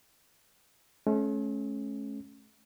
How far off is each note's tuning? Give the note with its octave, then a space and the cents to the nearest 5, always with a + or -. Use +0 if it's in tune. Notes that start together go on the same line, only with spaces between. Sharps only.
A3 -45 C#4 -15